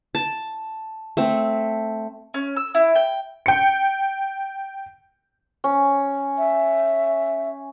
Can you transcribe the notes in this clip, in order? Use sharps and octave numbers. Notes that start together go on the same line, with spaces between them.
A5
A3 C4
C#4
E6
E4
G5
G5 C#7
C#4
E5